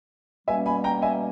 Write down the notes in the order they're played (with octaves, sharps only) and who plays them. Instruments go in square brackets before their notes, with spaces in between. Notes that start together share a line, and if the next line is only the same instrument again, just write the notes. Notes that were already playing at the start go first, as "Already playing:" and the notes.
[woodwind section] B2 G3 A#3 C#4 [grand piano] E5 G#5
[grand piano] G#5 B5
G5 A#5
E5 G#5